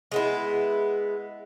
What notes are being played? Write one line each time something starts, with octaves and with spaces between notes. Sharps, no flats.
G#3 B3 E4